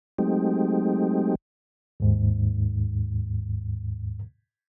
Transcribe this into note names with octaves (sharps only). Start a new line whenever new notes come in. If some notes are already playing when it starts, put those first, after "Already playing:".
F#3 G#3 A3 C4 D#4 G4
D#2 G#2